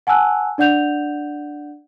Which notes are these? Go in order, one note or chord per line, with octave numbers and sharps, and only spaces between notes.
F#5 G#5 A5 E6 F#6
D4 D5 F#5 G6 F7